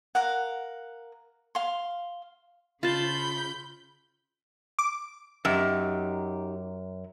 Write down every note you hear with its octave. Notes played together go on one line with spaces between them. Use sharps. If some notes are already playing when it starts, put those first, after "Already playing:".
A#4 F5 F#5
F5 C6
C#3 F4 A5 B5 G6
D6
F#2 D#4 G4